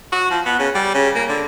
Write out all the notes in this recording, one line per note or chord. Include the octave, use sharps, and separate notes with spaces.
F#4
F3
B3
C#3
G3
C#3
A#3
D3